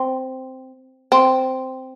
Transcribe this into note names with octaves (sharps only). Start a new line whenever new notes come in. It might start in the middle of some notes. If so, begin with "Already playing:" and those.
Already playing: C4
C4